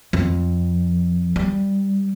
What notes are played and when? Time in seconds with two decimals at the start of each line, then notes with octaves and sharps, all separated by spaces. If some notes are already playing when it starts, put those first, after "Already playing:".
0.13 F2
1.36 G3